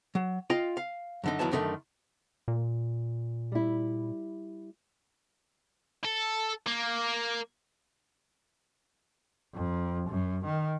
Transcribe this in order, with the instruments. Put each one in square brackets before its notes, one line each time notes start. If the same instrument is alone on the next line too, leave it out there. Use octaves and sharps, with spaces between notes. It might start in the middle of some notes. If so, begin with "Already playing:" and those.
[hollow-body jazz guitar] F#3
F4 D#5 F5 G5
F5
F#2 D3 D#4
D#2 F#3 B3 E4 A5
F#2 D3 D#3 G3 A3
[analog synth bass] A#2
[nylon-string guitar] G3 E4
[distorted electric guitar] A4
A#3
[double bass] F2
F#2
D#3